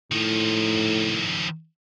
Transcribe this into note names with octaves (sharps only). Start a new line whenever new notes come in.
A2 D#3 F3